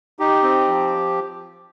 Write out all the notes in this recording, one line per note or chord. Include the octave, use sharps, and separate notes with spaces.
D#4 G4
C4
F3